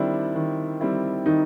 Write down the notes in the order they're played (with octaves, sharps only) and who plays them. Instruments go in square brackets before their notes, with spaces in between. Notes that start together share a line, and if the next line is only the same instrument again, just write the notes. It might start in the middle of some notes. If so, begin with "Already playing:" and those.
Already playing: [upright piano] D#3 G3 C4 E4 [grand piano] D4
[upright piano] D#3
G3 C4 E4
[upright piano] D#3 [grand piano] D#4